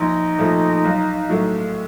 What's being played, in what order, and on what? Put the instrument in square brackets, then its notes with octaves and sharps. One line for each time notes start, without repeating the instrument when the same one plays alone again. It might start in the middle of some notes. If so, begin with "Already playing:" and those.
Already playing: [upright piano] A#1 [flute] D#4
[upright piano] A#2 F3 A3
B1
A2 F#3 A3